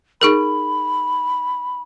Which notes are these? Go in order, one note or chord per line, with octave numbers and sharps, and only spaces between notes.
D#4 G#4 A#4 B5